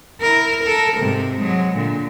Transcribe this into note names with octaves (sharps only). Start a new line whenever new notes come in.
E4 A#4
A4 A#4
G#2 C3
F#3 G#3
A#2 D3